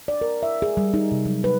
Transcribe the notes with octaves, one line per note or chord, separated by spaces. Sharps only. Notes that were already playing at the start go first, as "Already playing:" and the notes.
D5
A#4
E5
G#4
G3
D#4
C3
F#3
B4